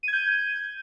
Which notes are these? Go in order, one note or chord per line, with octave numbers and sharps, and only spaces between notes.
G6 G#6 D#7